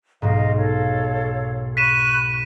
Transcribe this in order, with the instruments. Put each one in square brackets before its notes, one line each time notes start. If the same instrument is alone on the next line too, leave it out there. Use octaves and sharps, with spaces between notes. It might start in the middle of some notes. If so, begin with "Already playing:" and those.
[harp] B1 G#2 [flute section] D#5 F5
[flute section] A4 C#5 F5
[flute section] B5 C#6 F#6 [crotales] B6 D#7 E7